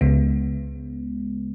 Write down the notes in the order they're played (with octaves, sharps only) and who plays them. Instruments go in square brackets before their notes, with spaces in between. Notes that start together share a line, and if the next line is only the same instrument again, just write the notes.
[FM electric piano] C#2 C#3 G#3 B3